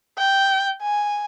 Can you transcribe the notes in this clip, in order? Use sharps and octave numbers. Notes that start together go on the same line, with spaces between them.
G5
G#5